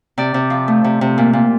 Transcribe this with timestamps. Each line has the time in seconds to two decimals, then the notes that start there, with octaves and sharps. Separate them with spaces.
0.18 C3 D5
0.34 C3
0.50 F3
0.68 A3
0.84 C3
1.01 C3
1.18 A#2
1.33 A#2